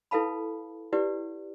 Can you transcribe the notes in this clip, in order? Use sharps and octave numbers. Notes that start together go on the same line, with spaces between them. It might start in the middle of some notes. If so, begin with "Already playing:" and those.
E4 A4 B4 F5 A5 B5
E4 G4 B4 D5 F#5